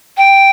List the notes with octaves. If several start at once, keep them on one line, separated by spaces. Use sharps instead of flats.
G5